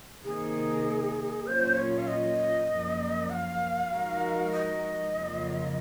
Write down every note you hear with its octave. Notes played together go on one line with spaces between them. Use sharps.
C3 D#3 A#3 D#4 G#4
A#2 F#3 C#4 F4 C5
C#5
F5
D#5
F#2 F3 A#3
F#5
F5
F3 G#3 D#4 F#4 A#4
D#5
F2 C#3 F#3 A#3 F4